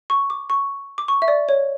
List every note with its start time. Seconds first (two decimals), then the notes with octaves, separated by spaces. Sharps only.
0.10 C#6
0.30 D6
0.50 C#6
0.98 D6
1.08 C#6
1.22 E5
1.28 D5
1.49 C#5